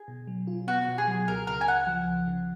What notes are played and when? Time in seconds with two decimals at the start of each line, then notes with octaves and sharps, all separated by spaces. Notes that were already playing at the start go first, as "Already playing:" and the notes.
Already playing: G#4
0.08 B2
0.27 F#3
0.47 F4
0.67 B3 F#4
0.88 B2
0.98 G#4
1.07 F#3
1.28 C#2 A#4
1.47 C#3 A#4
1.61 G#5
1.68 C#2 F#5
1.87 F3
2.07 C#2
2.28 C#3